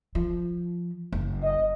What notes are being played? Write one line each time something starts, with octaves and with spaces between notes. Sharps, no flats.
F3
F#1
D#5